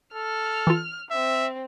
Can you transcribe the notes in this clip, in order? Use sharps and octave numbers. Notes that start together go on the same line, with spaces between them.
A4 F6
E3 F4
C4 E5